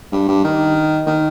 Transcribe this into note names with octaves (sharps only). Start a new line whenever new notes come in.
G2
G2
D#3
D#3